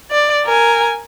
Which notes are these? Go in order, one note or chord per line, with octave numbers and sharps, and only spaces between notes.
D5
A#4 G#5